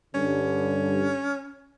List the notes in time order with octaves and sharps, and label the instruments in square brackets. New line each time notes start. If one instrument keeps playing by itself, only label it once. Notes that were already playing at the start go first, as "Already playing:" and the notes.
[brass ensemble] G2 D3 [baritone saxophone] C#4